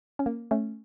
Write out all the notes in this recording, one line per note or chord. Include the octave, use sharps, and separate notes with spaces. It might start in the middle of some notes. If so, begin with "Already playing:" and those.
C#4
A#3
A3 C#4